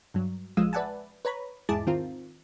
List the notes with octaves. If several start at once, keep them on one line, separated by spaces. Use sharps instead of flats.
G2 F#3
A1 F3 G#3 F5 D#6 E6
B4 D5 E5 F#5 G#5 A5
B4 C#5 A#5 B5
E2 G#2 E4 G#4 A5 D6
D#3 C4 F4 A#4